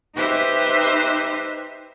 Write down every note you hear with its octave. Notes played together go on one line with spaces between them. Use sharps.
D#4 G4 B4 C5 E5